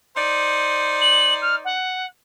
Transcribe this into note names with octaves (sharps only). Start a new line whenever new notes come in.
D#4 C5 D5
F#7
F6
F#5